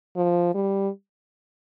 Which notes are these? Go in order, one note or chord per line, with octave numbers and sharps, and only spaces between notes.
F3
G3